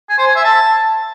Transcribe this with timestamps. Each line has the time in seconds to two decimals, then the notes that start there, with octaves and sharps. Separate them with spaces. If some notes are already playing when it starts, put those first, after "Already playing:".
0.09 G#5
0.18 C5
0.27 G#5
0.35 E5
0.44 A5